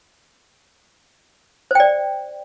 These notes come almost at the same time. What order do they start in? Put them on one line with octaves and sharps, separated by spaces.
C5 G5 D5